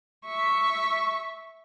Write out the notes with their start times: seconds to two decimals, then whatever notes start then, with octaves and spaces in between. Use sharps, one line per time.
0.26 E5 C#6